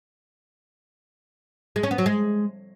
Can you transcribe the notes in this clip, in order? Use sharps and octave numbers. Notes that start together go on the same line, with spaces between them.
G#3
C#4
B3
F#3
G#3